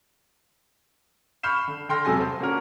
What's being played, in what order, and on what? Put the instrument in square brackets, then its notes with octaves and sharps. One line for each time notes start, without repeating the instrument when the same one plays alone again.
[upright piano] B5 C#6 F6 G6 C7 E7
D3
D3 G5 C6 F6 A#6
E1 C3 F#3 A4 G#5 A#6
C5
A#3 C#4 D4 F#4 A#4